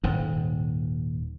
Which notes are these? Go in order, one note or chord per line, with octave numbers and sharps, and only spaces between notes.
D#1 G#2